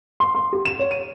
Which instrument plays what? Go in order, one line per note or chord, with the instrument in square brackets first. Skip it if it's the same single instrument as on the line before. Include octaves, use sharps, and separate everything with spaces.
[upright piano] C6
C6
G4
E7
C#5
D#7